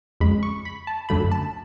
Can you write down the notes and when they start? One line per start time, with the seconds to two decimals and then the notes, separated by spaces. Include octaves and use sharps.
0.20 F2 C#3 G#3 B5
0.43 C#6
0.65 B5
0.87 A5
1.09 F#2 D3 F#3 A3 B5
1.32 A5